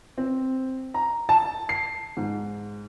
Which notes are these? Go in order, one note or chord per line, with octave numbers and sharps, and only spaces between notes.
C4
A#5
A5
C7
G#2